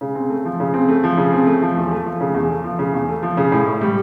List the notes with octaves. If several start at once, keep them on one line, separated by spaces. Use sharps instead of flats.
C#3
C4
A3
F3
C#3
C4
A3
F3
C#3
C4
A3
F3
E2
A3
F3
C#3
E2
A3
F3
C#3
E2
A3
F3
C#3
A2
A2
G3